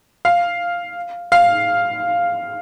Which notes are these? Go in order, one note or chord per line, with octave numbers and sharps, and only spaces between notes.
F5
F5